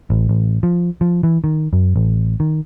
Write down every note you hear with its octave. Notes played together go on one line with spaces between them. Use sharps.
A1
A1
F3
F3
E3
D#3
F#2
A1
D#3